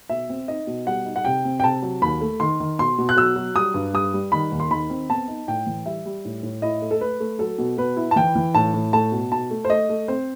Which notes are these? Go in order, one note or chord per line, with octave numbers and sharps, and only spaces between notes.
B2 E5
C4
D#4 D#5
B2
G3 F#5
D#4
F#5
C3 G5
C4
G5
C3 A5
F#3
D#2 B5
A3
D#3 C6
D#3
B2 C6
B2
F#6
F#3 E6
F#3
G3 D#6
G2
G3 D#6
G3
D#3 B5
D#2
C6
D#3 B5
C4
B3 A5
D#4
A2 G5
E3
G3 E5
G3
A2
A2
E4 D#5
A3
A4
A3 B4
A3
F#3 A4
B2
B2 B4
E4
A5
E3 G5
E3
A2 A5
A2
A3 A5
B2
B2 A5
A3
C5
A3 D#5
A3
C4 C5